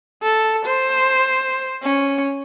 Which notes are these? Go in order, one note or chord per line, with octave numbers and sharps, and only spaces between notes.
A4
C5
C#4